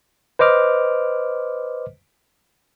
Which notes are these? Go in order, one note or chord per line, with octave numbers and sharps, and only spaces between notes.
B4 C5 D#5 D6 F6